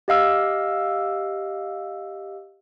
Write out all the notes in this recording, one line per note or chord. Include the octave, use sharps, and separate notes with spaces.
G4 D#5 F5 E6